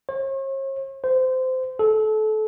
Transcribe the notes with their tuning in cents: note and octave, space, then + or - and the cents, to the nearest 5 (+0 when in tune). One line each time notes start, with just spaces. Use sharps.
C#5 -45
C5 -20
A4 -25